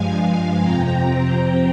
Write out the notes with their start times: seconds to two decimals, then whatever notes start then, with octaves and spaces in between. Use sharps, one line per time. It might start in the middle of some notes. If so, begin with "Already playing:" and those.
Already playing: G2 F3 G#3 F5 G#5
0.60 F2 C3 F3 C4 G5 A#5